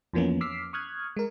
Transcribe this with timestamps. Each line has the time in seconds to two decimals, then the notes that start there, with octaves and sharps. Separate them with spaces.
0.13 F2 E3 F3 A#3 B3 C#4
0.41 D6 E6 F6 B6 C7
0.73 C#6 D#6 F6 F#6 G#6
1.17 G#3 A#4